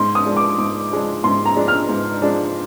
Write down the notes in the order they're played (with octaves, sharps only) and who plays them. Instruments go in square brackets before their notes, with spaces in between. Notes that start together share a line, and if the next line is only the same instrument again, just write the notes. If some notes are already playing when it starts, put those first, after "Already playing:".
Already playing: [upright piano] G#2 C6
D#6
F3 G#3 D4
D6
G#2
F3 G#3 D4
G#2 C6
A#5
F3 G#3 D4
F6
G#2
F3 G#3 D4